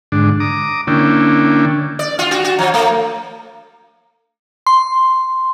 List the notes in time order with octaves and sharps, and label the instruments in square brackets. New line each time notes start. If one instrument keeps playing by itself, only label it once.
[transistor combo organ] G#2 D3 D4
A#5 D6 D#6
D3 A#3 C#4 D4 E4 G5
[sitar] D5
F4
F#4
F#4
F3
A3
[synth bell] C6